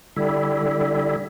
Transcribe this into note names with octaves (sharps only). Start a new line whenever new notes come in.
D3 G3 E4